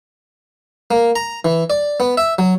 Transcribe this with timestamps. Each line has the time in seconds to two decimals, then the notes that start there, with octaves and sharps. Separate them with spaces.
0.91 A#3
1.16 A#5
1.45 E3
1.70 D5
2.00 B3
2.17 E5
2.39 F#3